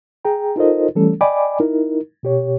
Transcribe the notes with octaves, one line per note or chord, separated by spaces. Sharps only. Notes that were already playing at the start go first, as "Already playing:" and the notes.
G#4 G5 A#5
D#4 F4 A4 A#4 C5 D#5
E3 G3 A3 C#4 A4
D5 D#5 G5 G#5 B5 D6
D#4 E4 A#4
B2 G4 C#5